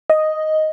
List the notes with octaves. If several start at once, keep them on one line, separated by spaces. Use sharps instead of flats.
D#5